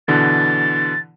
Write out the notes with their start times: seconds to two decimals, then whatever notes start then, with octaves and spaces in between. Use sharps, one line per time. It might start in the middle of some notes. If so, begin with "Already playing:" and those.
0.08 B2 D3 E3 A6